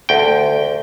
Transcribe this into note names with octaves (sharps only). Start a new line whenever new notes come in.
D2 G5